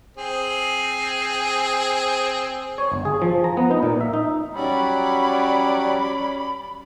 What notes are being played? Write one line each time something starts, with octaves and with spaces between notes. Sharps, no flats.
C4 G#4
C#5
G1
G#4
F3
A#5
B3
D#4
A#2
E5
D#4
F#3 G3 C#4 D5 B5